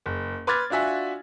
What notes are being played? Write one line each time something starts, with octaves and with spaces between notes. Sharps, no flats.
F#1
B4 C6 D6 F6 G#6 A6
D4 F4 F#4 E5 G#5